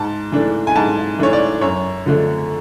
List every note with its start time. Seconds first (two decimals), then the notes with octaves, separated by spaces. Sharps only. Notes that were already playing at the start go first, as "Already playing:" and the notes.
Already playing: G#2 A5
0.32 E3 A3 D4
0.67 G#5
0.75 G#2 A5
1.19 E3 A3 D4 C#5
1.33 D5
1.61 F#2 C#5
2.06 D3 F3 A3 D4